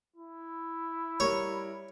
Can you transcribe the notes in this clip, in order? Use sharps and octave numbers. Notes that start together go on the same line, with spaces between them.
E4
G3 A#4 C#5